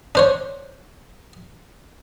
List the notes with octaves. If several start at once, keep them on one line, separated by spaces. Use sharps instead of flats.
D4 C5 C#5